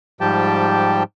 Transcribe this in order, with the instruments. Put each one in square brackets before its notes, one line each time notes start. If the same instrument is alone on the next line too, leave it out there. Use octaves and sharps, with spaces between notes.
[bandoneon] G#2 F3 G3 G4 G5 A5